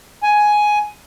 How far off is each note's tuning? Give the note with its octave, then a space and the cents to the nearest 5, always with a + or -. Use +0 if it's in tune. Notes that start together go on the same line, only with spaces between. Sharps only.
G#5 +10